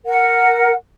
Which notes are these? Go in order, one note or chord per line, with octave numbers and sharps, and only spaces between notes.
A#4 F#5